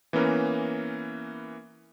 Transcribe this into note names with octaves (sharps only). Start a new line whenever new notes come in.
E3 A#3 B3 C#4 A#4